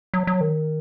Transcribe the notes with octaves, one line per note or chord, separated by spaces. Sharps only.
F#3
F#3
D#3